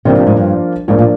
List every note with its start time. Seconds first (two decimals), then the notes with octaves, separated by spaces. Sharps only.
0.05 C3 F3 A#3 D4 F4
0.16 C3
0.27 G#2
0.36 G2
0.88 G#2 F3 A#3 D4 F4
0.99 A#2